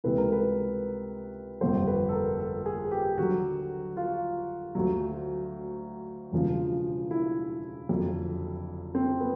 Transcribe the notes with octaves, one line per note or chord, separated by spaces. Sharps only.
C#2 C3 E3 B4
A#4
B4
G1 F2 C3 C5
B4
A4
A#4
A4
G#4
G4
D#2 D3 F#3 F#4
F4
D2 D3 F#3
E1 E2 C#3 F3
E4
F#1 F2 D3 F#3
C4
B3